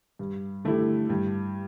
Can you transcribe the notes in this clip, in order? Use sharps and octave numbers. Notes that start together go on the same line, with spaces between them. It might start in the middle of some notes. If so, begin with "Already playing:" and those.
G2
D3 A3 E4 G4
G2